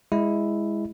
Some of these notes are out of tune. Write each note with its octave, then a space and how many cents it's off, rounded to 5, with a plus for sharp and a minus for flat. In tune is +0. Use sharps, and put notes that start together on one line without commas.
G#3 -10 E4 +0